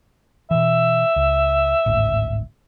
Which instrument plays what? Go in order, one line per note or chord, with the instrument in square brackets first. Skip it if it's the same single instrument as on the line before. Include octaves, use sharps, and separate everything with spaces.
[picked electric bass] B2 E3 [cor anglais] E5
[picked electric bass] C#2
G#1 D2 A2